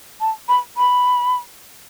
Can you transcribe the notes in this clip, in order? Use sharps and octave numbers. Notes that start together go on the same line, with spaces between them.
A5
B5
B5